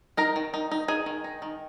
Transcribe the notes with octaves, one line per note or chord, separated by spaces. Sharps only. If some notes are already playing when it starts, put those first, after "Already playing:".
D#4 A#4 A#5
D#3
D#4
D#4
D#4 G#4 G#5
D#3
D#4
D#3